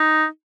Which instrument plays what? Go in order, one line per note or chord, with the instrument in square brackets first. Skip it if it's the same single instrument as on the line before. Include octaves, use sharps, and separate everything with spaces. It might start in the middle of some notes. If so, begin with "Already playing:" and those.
Already playing: [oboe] D#4